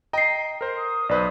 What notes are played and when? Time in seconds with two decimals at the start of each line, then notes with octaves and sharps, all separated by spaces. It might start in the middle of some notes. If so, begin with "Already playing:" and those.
0.13 D#5 G5 A#5 C7
0.61 A#4 C5
0.77 D#6
1.09 B1 B4 C5 D5